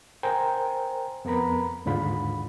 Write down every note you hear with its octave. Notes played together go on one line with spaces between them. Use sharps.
A#4 C5 G5 G#5 A#5
F2 B3 A#4 A#5 B5
D#2 G#2 D3 F4 B5